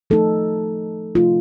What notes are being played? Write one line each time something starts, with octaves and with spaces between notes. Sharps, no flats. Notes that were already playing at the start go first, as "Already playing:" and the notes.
F3 A3 D#4 A4
C3 F3 A3 D#4 F4